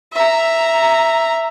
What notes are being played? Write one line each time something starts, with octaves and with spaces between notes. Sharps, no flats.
E5 A#5